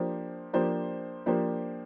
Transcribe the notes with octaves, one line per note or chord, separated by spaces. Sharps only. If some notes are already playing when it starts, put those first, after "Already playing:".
Already playing: F3 A#3 D4 G4 C5
F3 A#3 D4 G4 C5
F3 A#3 D4 G4 C5